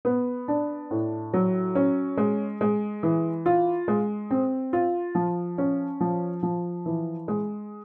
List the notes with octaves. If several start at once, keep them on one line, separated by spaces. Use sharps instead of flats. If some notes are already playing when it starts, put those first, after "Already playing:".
B3
D4
A2
F#3
C#4
G#3
G#3
E3
F4
G#3
C4
F4
F3
C#4
F3
F3
E3
G#3